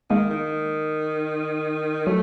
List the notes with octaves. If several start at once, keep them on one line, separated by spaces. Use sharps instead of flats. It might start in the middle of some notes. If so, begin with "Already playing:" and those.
D#3 G#3 A#3
D#3
F#3 A3